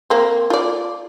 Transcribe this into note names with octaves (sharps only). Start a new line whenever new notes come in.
A#3 C4
F4 D5